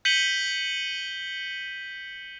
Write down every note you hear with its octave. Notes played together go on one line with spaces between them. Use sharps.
G6 B6 C#7 D#7 F#7 G7